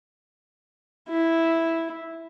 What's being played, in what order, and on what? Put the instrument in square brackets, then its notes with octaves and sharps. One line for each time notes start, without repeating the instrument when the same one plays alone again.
[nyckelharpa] E4